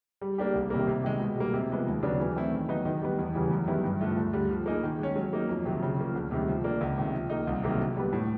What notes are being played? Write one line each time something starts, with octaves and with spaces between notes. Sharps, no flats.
G3
A#3 D4 G4
C2
C3 D#3 G3 A#3
C3
D#3 G#3
B2
G3 A#3
C3
F3 G#3 B3
D#2
C#3 F#3 B3 D4
E3
A3 C4 E4
D#3
F#3 B3 D#4
D#3
G3 B3
E2
C#3 E3 G3
F#2
D#3 G3 B3 E4
G2
D3 F3 A3
D2
D3 G3
F3
A#3 D#4 G#4
D#3
G#3 C#4
F#3
A#3 D#4
F2
C3 D#3 F#3
C#3
F3 A#3
D2
C3 D#3 G3
F3
A#3 D4
C#2
C3 D#3
F3
A#3 D#4
C2
C3 D#3 F#3 A#3
D3
G3 B3
A2